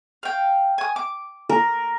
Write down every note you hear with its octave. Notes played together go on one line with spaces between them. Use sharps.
F5 G5
G#5 D#6
D6
A#4